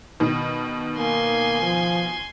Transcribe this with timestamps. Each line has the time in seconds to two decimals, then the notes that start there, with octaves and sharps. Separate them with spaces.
0.20 B2 D#3
0.99 A#3 G#5 C6
1.62 F3